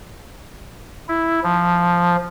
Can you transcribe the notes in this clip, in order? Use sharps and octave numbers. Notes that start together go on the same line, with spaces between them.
E4
F3